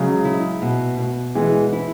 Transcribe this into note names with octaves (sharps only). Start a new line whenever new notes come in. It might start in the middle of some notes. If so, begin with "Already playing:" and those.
Already playing: C#3 F#3 G#3
E4
B2
B2
E3 G#3 B3
E4